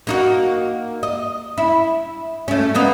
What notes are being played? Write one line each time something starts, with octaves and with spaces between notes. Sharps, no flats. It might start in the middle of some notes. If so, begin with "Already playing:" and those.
A#3 D#4 F#4
D#5
E4
A3 C#4
A#3 B3 D#4